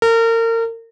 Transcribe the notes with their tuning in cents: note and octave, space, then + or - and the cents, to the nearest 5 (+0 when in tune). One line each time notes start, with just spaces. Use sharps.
A#4 -35